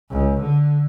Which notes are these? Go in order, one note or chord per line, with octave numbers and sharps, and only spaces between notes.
C#2
D3